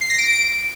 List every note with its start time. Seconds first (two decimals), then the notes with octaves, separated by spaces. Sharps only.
0.01 C7
0.10 A#6
0.18 D7